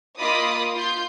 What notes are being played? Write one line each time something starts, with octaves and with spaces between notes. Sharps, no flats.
A#3 F4 D#5 B5 D6 D#6
F4 C6 G6